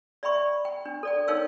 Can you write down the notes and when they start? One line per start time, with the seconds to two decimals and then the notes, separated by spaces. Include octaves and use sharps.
0.23 D5 E5 G5 B5 C#6
0.65 G5
0.85 D4
1.03 A4 D5 G5
1.28 D#4 A#4 C#5 F5 G5 E6